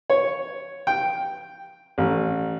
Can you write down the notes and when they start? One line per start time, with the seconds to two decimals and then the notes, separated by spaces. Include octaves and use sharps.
0.10 C#5
0.87 G5
1.98 A1